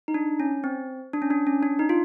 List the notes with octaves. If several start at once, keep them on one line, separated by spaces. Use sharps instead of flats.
D#4
D4
C#4
C4
D4
C#4
D4
C#4
D4
D#4
F4